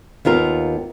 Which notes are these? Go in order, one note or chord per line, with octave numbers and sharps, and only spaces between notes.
D#2 B3 F4 A#4